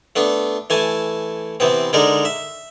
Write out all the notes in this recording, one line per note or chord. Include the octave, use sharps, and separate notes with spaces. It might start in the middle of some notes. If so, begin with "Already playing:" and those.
A3 B3 D4
E3 A3 G#5 A5
C3 E3 B3 C4
D3 G#3 D#4 A#4 D5
E5